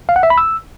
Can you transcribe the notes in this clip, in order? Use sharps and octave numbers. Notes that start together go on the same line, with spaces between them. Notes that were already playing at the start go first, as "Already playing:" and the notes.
F5
F#5
E5
B5
E6